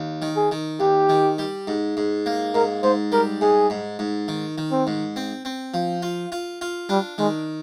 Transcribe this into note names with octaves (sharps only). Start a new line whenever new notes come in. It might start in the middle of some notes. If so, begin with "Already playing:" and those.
Already playing: D#2
D#3
G#4
D#3
D#2 G4
D#3
G3
G#2
G#2
A#3
G#2 A#4
G#2 C5
G3 A#4
G#2 G#4
G#2
G#2
D#3
D#3
C4
G#2
C4
C4
F3
F4
F4
F4
G3 D4
D#3 G#3